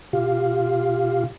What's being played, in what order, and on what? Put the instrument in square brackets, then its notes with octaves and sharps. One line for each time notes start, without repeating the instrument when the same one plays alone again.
[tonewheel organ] B2 F4 G4 F5